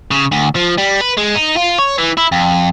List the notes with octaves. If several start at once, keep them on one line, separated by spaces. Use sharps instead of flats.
C#3
D2
F3
G3
B4
G#3
D#4
F4
C#5
E3
E4
F2